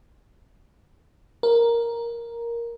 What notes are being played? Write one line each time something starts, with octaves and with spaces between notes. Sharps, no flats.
A#4